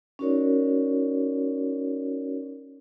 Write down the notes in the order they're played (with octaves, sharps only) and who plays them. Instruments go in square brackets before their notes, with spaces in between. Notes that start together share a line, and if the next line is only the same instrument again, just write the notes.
[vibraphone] C#4 D#4 F#4 A#4 C#5 D5